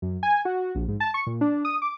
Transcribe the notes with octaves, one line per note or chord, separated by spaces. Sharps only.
F#2
G#5
F#4
A#1
G#2
A5
C#6
A#2
D4
D#6
D6